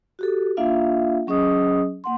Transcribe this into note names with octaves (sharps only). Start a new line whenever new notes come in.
F#4 G4 A4
A#3 D4 F4 E5 F5
F#3 C#4 G#4 D#5 D#6
A#3 F#5 C6